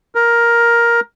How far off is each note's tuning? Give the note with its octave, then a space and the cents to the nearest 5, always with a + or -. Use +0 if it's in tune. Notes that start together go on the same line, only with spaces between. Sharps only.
A#4 +10